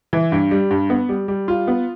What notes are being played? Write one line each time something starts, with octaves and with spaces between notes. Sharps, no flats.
E3
G2
G3
G2
B3
G3
G3
F4
B3